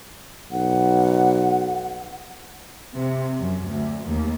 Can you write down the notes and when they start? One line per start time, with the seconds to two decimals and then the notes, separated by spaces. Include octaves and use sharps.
0.52 B1 F#5
2.94 C3
3.38 F#2
3.68 D2
4.06 D#2